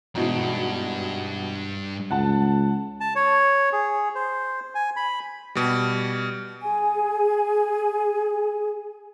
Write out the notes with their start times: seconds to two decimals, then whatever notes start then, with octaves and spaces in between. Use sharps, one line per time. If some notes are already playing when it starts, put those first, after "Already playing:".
0.15 G#1 G2 B2 E3
2.11 C#2 F#5 A5
3.00 A5
3.15 C#5
3.72 G#4
4.15 C5
4.75 G#5
4.96 B5
5.55 B2 G3
6.62 G#4 G#5